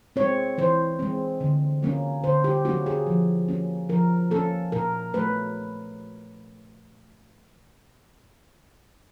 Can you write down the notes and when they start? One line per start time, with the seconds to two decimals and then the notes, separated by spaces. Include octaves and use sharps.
0.16 G#3 C4 C#5
0.58 E3 C5
0.99 G#3 C4
1.41 D3
1.83 F#3 A#3 C#4
2.23 D3 C5
2.44 G4
2.65 F#3 A#3 C#4 F#4
2.86 G#4
3.07 F3
3.48 A#3 C#4
3.89 F3 A#4
4.31 A#3 C#4 A4
4.72 A#2 A#4
5.14 F#3 A3 B4